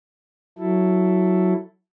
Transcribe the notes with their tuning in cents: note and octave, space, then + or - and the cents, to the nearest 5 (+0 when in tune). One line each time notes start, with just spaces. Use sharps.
F#3 +0 E4 +5 A4 +0